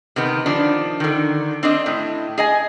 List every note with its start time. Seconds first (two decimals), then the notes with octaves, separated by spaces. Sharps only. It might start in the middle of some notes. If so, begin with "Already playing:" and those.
0.16 C3 D#3 B3
0.46 D#3 F3 D4
1.00 D3 D#3
1.63 C4 D4 D#5
1.86 A2
2.38 G#4 D#5 G#5